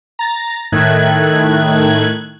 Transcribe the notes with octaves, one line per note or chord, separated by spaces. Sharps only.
A#5 A6
A2 D#3 A3 F#6 G#6